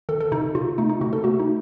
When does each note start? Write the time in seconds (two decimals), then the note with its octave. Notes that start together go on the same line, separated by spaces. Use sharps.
0.09 D#3 A4
0.21 A4
0.32 C3 D#4
0.55 C3 F4
0.78 A3 D#4
0.89 D#4
1.01 C3 F#4
1.13 A4
1.24 A3 F#4
1.40 D#4